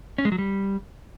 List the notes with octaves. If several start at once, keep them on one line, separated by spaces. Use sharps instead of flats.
C#4
G#3
F#3
G3